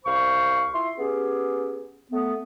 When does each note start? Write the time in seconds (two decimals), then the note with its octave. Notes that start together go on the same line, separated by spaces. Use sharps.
0.05 C2 C5 F5 B5 C#6
0.73 E4 F4 C6
0.96 B3 C#4 G4 G#4
2.11 A3 B3